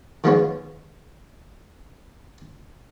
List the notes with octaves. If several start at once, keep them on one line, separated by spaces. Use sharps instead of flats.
D#3 F3 G#3 B3 F4 C#5